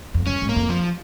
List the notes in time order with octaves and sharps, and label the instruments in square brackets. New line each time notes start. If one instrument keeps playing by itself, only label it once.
[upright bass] F2
[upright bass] F#2 [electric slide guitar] C#4
[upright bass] G#2
[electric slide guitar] A#3
[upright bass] F2
[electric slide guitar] F3